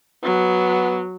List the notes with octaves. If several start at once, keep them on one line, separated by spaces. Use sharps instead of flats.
F#3 B3